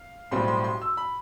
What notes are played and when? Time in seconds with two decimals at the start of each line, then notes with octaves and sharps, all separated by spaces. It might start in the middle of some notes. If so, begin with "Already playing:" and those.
Already playing: F5
0.31 B1 A2 G3 C4 C6
0.48 C6
0.64 C6
0.82 E6
0.97 B5